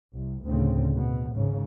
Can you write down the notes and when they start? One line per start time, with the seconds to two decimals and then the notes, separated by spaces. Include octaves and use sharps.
0.13 C2
0.45 D2 A2 C#3 C4
0.95 B2
1.35 G#1 G#2 C#3